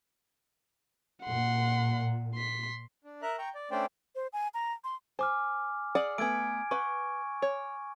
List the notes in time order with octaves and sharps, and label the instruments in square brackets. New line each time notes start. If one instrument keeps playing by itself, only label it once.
[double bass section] A#2 [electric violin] F#5 C6
[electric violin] C6 B6
[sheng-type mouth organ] D4
A#4 E5 A#5 F#6
G5 A#5 C#6 G6
D5
A3 C#4 D4 C5 D5 G5
[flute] C5
G#5
A#5
C6
[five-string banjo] C5 [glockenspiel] G#5 D6 F6
[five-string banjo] G#4 D5 F#5
[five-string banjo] A3 B3 [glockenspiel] G#5 G#6 D7
[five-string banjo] B4 F#5 [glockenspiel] C#6
[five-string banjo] C#5